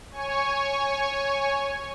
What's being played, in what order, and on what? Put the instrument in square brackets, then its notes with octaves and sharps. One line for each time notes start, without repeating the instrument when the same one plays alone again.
[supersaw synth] C#5 G#5 C#6